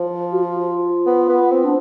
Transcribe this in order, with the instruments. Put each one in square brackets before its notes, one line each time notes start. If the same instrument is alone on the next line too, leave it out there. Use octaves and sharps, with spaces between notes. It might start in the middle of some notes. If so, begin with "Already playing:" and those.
Already playing: [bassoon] F3
[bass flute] F#4
F4
[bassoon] B3
B3
C4
[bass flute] D4